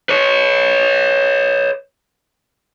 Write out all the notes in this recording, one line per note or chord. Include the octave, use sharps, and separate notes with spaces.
B4 C#5